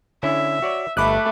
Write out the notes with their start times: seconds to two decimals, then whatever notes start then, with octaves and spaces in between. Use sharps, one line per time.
0.23 D3 C#4 E4 E5
0.62 F#4 C#5 D5
0.97 G1 A3 D#5 B5 D6 F#6